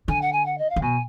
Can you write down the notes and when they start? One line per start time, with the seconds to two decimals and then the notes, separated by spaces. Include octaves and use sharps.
0.08 D3 G#5
0.21 F#5
0.32 G#5
0.45 F#5
0.58 D#5
0.69 F5
0.76 D3
0.82 B2 G#5